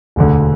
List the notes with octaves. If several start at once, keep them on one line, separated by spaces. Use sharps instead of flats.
E1 D2 D3